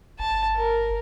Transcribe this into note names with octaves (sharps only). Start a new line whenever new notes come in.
G1 A5
A#4